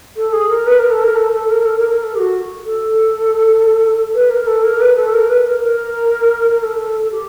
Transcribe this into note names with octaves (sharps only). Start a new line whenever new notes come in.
A4
G#4
A#4
B4
A#4
A4
A#4
A4
A4
A#4
A4
A#4
A#4
A4
G4
F#4
A4
B4
A#4
A4
A#4
B4
A4
A#4
B4
A#4
A#4
A#4
A4
G4